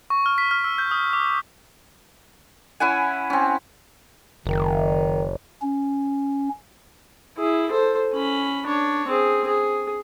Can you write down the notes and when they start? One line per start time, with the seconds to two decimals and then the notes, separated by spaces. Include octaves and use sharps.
0.10 C#6
0.26 F6
0.38 B6
0.51 F6
0.64 E6
0.78 G6
0.91 D#6
1.13 D6
2.80 C#4 E4 F#5 G#5
3.30 C4 C#4
4.46 F#1 D#3
5.62 C#4
7.38 E4 G#4
7.69 A4 C5
8.14 C#4 B5
8.66 D4 C#5
9.07 C4 G#4
9.47 G#4